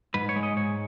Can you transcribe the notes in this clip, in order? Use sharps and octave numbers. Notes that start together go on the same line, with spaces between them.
G#2 B4
C#5
G#3
D#5
G#2 C#5